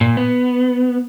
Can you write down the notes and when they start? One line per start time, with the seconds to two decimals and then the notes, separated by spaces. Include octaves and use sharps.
0.01 A#2
0.17 B3